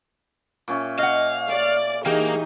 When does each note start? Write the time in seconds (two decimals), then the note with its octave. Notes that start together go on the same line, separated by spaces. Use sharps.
0.68 A#2 C#4 E5
0.99 D#5 F5 F#5
1.50 D5
2.05 E3 A#3 D#4 G4 G#4